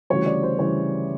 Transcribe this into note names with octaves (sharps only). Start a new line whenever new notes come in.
D2 C#3 E3 G3 C#5
D5
C5
C#3 E3 G3 C#5